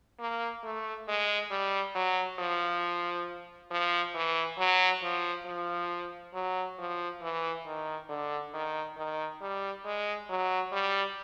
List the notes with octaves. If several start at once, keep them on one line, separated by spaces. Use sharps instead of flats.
A#3
A3
G#3
G3
F#3
F3
F3
E3
F#3
F3
F3
F#3
F3
E3
D#3
D3
D#3
D#3
G3
G#3
F#3
G3